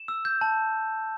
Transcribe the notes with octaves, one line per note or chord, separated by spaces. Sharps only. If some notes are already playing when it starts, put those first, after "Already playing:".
Already playing: E7
E6
G6
A5